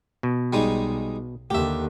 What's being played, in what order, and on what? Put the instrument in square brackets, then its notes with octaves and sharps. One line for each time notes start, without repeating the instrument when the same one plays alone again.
[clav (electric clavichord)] B2
[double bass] B1 [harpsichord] G3 G#3 D#4
[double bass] D#2 D3 [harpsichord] G4 E5